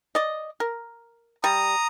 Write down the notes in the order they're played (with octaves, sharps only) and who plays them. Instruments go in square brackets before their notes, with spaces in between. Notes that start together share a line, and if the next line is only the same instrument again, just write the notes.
[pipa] D5 D#5
A#4
[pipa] G3 [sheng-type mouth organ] A#5 D#6